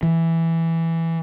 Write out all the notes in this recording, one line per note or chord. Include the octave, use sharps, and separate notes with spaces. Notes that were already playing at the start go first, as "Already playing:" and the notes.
E3